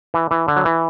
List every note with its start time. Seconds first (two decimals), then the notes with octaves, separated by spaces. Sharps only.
0.14 E3
0.31 E3
0.48 D3
0.56 F#3
0.65 E3